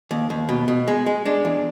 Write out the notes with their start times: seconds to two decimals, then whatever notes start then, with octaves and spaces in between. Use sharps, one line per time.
0.11 D#2
0.30 D#2
0.49 B2
0.68 B2
0.88 G#3
1.06 G#3
1.25 G#3 D4
1.45 E2